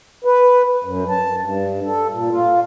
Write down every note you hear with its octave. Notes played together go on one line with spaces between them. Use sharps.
B4
F#2
A5
G2
A4
A#2
F4